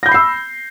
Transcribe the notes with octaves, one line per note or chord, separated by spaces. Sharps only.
B5 E6 G6 A#6 C7